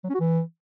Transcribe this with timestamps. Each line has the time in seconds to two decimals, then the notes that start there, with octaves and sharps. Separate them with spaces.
0.04 F#3
0.09 C#4
0.15 F#4
0.20 E3